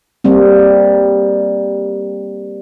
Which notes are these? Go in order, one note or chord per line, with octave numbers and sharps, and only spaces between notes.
G3 A#3 C4